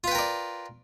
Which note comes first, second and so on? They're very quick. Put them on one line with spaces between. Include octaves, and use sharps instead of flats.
F4 B4 G5 A#4 D5